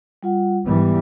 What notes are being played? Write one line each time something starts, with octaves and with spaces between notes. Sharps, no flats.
G3 F4 F#5
G#2 E3 G3 B3